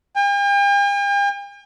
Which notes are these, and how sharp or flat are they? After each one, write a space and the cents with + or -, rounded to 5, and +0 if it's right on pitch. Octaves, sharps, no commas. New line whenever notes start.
G5 +45